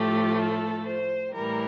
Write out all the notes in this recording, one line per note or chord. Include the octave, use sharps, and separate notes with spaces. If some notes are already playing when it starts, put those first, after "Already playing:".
Already playing: A2 F3 A3 G4
A4
C5
A2 E3 G3 A#4